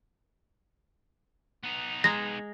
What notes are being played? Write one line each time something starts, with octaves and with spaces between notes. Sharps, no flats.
B3 D#4
G#3 A#5 A#6